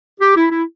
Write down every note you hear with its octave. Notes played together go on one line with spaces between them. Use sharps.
G4
E4
E4